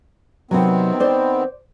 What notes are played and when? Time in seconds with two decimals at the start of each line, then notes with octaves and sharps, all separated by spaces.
0.51 C3 D#3 F#3 B3 C4
1.00 C5 D5